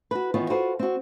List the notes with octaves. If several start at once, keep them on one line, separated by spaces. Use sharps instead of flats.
F#4 B4
D#3 E3 B3 F4 C#5
F4 F#4 A4 B4 C5
C4 F#4